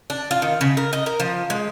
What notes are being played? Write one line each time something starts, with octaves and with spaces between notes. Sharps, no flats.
D4
F4
D#3
C#3
A#4
D#5
A#4
F3
G#3